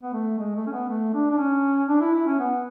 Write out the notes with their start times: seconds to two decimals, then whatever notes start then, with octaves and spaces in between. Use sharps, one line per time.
0.02 B3
0.13 A3
0.38 G#3
0.55 A3
0.67 C#4
0.72 B3
0.89 A3
1.14 D4
1.31 D4
1.38 C#4
1.88 D4
2.00 E4
2.14 E4
2.26 C#4
2.39 B3